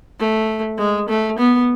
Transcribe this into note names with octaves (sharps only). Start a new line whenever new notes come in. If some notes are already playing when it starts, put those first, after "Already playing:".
A3
G#3
A3
B3